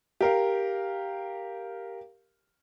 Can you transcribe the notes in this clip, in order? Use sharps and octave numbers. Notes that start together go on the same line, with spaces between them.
G4 A#4 F5